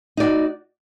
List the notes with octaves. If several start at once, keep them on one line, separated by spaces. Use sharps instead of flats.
D#4 F#4 D5